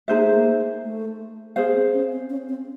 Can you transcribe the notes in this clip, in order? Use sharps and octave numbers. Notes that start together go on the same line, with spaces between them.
A#3 D#4 G#4 C5 E5
A3
A#3
A3
B3 G#4 C5 F5
C4
C#4
C4
C#4
C4